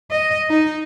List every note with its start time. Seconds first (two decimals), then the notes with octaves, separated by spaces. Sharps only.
0.11 D#5
0.50 D#4